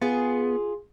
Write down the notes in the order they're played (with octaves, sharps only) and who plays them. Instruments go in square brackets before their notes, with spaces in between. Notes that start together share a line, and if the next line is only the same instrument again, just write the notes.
[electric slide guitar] B3 [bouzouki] F4 G#4